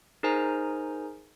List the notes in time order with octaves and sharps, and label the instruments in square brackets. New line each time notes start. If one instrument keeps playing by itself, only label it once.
[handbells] D#4 G#4 A#4 C5 G#5 A#5